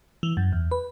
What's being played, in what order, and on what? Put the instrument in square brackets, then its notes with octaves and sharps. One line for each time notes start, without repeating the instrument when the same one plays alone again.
[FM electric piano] E3
F#2
E2
B4